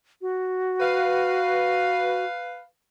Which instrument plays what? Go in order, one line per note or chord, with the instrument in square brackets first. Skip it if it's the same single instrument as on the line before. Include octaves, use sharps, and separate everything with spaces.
[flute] F#4
[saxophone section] B4 F5